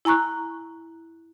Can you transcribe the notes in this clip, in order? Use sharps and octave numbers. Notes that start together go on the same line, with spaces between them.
E4 G#5 A#5 C#6 F#6